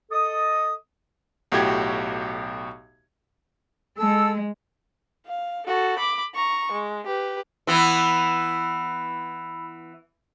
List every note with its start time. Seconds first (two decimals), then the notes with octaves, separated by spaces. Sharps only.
0.11 A4 D#5 D#6
1.52 B1 A2 F#4 G4 G#6
3.98 G#3 A4 E6
5.26 F5
5.66 F#4 A4
5.98 B5 D6
6.34 A#5 C#6
6.72 G#3
7.07 G4 B4
7.67 E3 B3 B5 E6